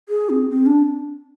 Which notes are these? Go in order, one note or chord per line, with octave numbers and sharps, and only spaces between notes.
G#4
C4
C4
D4